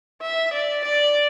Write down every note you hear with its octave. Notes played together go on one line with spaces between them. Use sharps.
E5
D5
D5